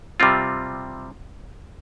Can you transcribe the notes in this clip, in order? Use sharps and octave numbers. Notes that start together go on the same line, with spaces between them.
C3 G3 C4 F4